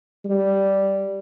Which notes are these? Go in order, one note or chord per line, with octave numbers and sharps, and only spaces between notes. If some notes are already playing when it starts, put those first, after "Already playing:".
G3